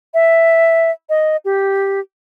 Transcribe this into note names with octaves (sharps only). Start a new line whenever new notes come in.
E5
D#5
G4